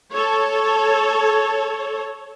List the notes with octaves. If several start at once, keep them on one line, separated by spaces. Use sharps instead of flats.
A4 C#5